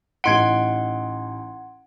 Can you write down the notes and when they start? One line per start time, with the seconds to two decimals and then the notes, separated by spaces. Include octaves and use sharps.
0.24 A1 D#4 F#5 C6 G#6 D7